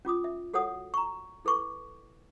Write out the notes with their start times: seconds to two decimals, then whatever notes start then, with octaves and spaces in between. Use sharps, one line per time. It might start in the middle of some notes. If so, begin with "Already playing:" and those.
0.05 C#4 F4 D6 D#6
0.24 E5
0.54 F#4 A4 C#5 F#5 D#6
0.94 A#5 C#6
1.45 E4 A4 B4 C#6 D6